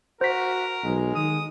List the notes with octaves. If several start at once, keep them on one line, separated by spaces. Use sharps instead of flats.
F#4 A#4 C5 B6
B1 G#3
D#3 D#6